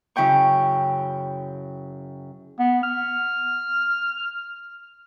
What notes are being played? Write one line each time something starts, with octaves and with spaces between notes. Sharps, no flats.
F#2 C#3 E4 G5 C#6
B3
F6